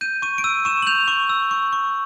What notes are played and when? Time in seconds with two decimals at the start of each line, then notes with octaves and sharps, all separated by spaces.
0.01 G6 D#7
0.22 C#6 D#7
0.38 D7
0.44 E6 D#7
0.65 C#6 E7
0.82 F#7
0.87 G6 F7
1.08 C#6
1.30 E6
1.51 C#6
1.73 C#6